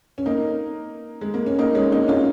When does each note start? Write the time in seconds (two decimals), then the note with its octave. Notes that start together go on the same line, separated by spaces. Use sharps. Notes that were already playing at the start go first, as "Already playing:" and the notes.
0.18 C#4
0.26 A#3 D#4
1.21 G#3
1.34 A#3
1.46 C#4
1.59 A#3 D#4
1.75 G#3 C#4
1.92 A#3 D#4
2.08 C#4 F4